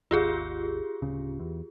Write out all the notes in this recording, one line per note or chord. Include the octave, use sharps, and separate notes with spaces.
G#1 D#2 F4 G4 G#4
D1 C#3
E2